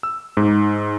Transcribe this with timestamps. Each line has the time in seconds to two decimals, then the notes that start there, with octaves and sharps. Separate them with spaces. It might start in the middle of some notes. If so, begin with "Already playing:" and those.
0.03 E6
0.37 G#2